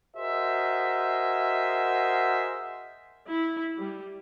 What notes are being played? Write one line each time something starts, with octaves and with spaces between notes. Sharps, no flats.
F#4 G#4 A#4 C5 D#5 E5
E4
G3